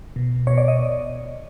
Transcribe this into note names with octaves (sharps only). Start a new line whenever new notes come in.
B2
B2 C#5
D5
D#5